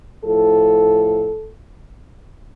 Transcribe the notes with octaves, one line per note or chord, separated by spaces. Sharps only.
A2 F3 A4